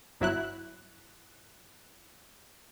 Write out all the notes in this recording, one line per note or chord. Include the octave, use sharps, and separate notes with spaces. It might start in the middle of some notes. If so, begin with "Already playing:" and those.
G1 F#3 E4 F#6